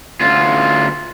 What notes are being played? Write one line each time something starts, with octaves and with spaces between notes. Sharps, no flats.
D2 F4